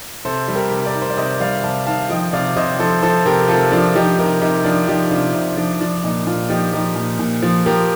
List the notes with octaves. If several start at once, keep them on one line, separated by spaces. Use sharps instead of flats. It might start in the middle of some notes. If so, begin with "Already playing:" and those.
C3 A4 C5
G3
G4 A#4
C3
A#4 D5
D#3
C5
D5
C3 C5 D#5
G3 D5 F5
C3 F5 A5
D#3 F5 A5
F3 D#5 G5
C3 D5 F5
C3 C5 D#5
F3 A4 C5
F3 A4 C5
C3 G4 A#4
C3 F4 A4
F3 D4 F4
F3 D#4 G4
C3 G4 A#4
C3 D#4 G4
F3 D4 F4
F3 D#4 G4
C3 D4 F4
C3
F3 D4
F3 D4
A#2 D#4
A#2 D4 F4
F3 D#4 G4
F3 D#4 G4
A#2
A#2
F3
F3 G4 A#4